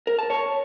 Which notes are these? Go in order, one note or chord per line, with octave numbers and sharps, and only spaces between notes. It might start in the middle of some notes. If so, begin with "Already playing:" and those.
A#4
A5
C#5